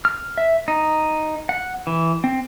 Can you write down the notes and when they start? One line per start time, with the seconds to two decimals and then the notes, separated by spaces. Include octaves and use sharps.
0.05 F6
0.38 E5
0.68 D#4
1.49 F#5
1.87 E3
2.24 C4